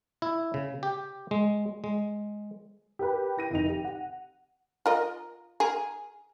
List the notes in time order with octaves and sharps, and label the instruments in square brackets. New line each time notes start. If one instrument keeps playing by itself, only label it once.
[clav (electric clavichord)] E4
C#3
G4
G#3
G#3
[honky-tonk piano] G4 A#4 B4
E4 A#6 D#7
F1 D#3 D#4 F7
G4
F#5
[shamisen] F4 A#4 D#5
G#4 A#4